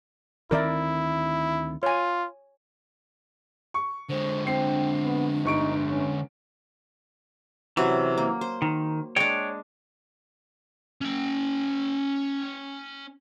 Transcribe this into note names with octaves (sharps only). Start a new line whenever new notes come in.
D2 D#3 C4 E4 A#4 D5 E5
F4 C#5 G#5
C#6
D3 G#3 C5
C4 D4 G5 C7
B3
G1 D#4 C#6 D7
C#4
C3 E3 F#3 C#4
A#3
C5
D#3
G#3 D4 C#5 G5
C#4 G5